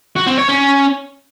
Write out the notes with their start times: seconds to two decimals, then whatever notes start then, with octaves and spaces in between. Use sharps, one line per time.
0.16 F#4
0.27 C4
0.38 C#5
0.48 C#4